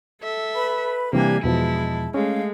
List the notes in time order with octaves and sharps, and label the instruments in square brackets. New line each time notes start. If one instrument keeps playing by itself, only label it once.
[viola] A4 E5
[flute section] B4 B5
[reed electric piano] C3 E3 G3 [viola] A#3 G#5 [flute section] D4 G4 D5
[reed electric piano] E2 B2 F3 [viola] G#3 E4 [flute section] A5
[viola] G#3 A3 [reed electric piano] C#4 [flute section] F5